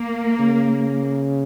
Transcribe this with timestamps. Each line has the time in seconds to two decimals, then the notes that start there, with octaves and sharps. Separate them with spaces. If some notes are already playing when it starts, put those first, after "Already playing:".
Already playing: A#3
0.40 C#3